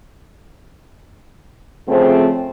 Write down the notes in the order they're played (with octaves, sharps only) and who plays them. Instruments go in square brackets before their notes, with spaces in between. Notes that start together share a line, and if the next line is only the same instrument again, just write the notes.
[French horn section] C#3 F3 A3 C4